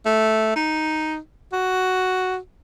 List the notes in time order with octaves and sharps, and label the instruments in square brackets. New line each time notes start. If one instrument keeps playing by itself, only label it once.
[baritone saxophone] A3
D#4
F#4